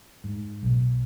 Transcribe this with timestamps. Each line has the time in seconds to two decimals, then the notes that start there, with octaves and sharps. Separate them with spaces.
0.24 G#2
0.63 B1